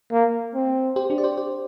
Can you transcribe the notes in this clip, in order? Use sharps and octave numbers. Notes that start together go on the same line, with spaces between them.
A#3
C4
G4 C5
D4 G4
D5
G4 C5
G4 C5